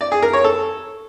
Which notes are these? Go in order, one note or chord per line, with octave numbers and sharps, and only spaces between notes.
D5
G#4
A#4
C#5
A4